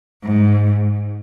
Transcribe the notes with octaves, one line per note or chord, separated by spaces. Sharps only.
G#2